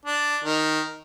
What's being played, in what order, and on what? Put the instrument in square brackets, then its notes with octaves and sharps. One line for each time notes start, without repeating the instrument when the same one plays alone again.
[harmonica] D4
D#3